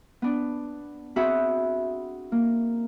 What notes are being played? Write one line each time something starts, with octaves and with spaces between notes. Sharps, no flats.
B3 D4
C4 F#4 G#4 E5 F#5 B5
A#3